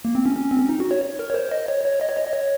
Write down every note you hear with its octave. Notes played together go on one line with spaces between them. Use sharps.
A#3
C4
C#4
C#4
C4
C#4
D#4
F#4
C#5
A#4
C#5
C5
D#5
C#5
C#5
D#5
C#5
D#5
D#5
C#5